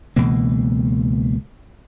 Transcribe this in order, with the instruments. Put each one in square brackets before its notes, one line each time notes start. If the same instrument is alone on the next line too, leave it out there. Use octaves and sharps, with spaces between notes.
[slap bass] C#2 B2 E3 A#3